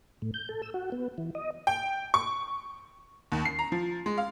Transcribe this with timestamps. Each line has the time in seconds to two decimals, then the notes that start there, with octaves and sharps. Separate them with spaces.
0.22 A2
0.34 G6
0.49 A4
0.62 E6
0.74 F#4
0.92 B3
1.18 E3
1.35 D#5
1.67 G5
2.14 C#6
3.32 D#2
3.45 C7
3.59 A#5
3.72 F3
4.06 G#3
4.18 F5